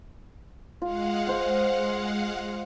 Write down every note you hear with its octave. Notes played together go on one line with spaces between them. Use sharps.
G#3 F4 F5 F#5
C5 D#5